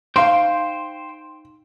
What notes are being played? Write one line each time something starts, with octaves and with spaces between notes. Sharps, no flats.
D#4 C5 F5 G5 C6